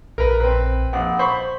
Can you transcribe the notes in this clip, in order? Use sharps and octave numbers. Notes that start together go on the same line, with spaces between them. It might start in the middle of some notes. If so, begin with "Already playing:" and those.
A#1 A#4 B4
C4 B4
A#1 F#5
C5 B5 C#6